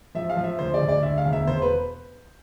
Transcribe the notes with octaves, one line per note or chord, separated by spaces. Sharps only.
F3 E5
F5
F3
E5
D2 C5
D5
D2
D5
D2 E5
F5
E1
E5
E1 C5
B4